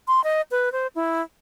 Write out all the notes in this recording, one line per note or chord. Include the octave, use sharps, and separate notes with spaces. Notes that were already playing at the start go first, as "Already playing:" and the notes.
C6
D#5
B4
C5
E4